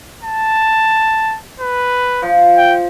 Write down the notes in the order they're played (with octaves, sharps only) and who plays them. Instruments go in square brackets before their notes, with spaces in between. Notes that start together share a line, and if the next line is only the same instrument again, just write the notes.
[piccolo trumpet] A5
B4
[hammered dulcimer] F3
[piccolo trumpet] G5